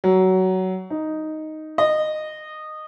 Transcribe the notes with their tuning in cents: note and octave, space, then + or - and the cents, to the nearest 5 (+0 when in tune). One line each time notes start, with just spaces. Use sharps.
F#3 +15
D#4 +0
D#5 -15